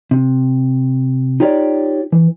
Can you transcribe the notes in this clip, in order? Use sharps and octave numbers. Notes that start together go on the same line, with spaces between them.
C3
D#4 F4 G4 C#5 D5
E3